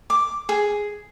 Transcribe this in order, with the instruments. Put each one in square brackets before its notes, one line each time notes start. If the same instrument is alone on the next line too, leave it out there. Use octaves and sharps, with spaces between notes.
[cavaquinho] D6
G#4